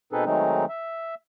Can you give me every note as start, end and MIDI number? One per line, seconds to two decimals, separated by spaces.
0.13 0.25 47
0.13 0.25 60
0.13 0.25 63
0.13 0.25 68
0.13 0.25 69
0.13 0.25 71
0.25 0.65 51
0.25 0.65 54
0.25 0.65 56
0.25 0.65 57
0.25 0.65 60
0.25 0.65 63
0.69 1.15 76